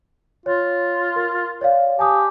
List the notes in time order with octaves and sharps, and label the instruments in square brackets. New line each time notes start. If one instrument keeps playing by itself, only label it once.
[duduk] F4 [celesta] C#5
[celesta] A#4
C#5 D5 F5
[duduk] G4 [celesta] G#5 A5 D#6